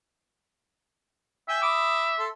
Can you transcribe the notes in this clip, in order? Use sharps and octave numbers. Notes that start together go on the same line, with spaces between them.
E5 G5 G#5
B5 D6 D#6
A4 C6